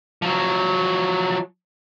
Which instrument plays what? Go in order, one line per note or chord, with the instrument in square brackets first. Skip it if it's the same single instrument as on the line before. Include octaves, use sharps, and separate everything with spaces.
[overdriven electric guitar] F3 F#3